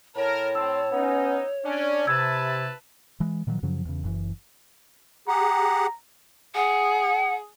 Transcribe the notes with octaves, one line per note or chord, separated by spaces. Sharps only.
A2 A#4 C#5 A5
C4 E6
B3 C#4 D#4
C#4 D4 D5
C3 E4 B4 A5 E6 G#6
E3 G#3
A#2 D#3 F3 F#3
F#2 C#3 F3 F#3
E2 C#3
F#1 F#2 C3 E3
G4 G#4 F#5 A#5
G#4 F#5